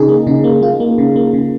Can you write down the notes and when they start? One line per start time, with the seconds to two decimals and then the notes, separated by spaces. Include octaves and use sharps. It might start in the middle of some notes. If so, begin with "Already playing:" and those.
Already playing: C#3 D#4 G#4
0.09 A#3
0.27 C#3 D#4
0.44 A#3
0.61 A#3 F4
0.80 A#3
0.98 C#3
1.16 A#3
1.33 C#3